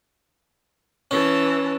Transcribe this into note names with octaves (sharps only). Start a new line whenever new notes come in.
E3 C#4 A5